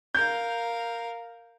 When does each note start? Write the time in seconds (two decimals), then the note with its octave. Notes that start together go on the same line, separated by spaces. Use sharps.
0.15 A#4 F5 G6